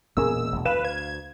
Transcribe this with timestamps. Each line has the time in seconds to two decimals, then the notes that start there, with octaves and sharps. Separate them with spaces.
0.17 E1 A#2 C#4 G#4 A#4 E6
0.52 E1 D2 B2
0.65 D2 B4 F5 E7
0.85 G#6